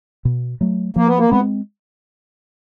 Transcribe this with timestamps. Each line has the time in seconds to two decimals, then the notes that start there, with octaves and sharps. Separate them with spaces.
0.25 B2
0.61 F#3 A3
0.96 F3 A#3
1.07 B3
1.19 A#3
1.29 G#3 B3 C4